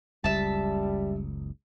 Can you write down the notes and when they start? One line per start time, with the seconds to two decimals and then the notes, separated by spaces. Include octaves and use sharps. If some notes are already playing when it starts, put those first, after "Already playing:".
0.24 F#1 C#2 G3 E5 A5